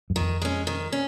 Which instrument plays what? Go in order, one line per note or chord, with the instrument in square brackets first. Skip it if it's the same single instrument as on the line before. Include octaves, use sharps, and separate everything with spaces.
[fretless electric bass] F#2
[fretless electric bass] F2 [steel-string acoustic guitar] D#3
[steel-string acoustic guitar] G#3 C#4
D#3
C#4